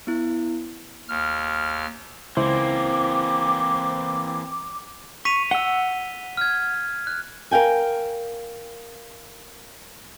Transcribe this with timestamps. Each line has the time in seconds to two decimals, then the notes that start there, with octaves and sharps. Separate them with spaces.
0.07 B3 E4
1.09 D#2 F6
2.37 C#2 E3 A#3 C4 E4 C5 D6
5.25 C#6 B6 D#7 F7
5.51 F#5 E6 G7
6.37 F6 G#6
7.07 F#6
7.51 A#4 F5 G5 G#5